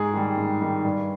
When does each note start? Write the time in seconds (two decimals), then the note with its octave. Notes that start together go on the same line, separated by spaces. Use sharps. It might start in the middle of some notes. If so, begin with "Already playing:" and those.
Already playing: G#2 G#4
0.14 D#3 G3
0.37 G#2
0.61 D#3 G3
0.85 G2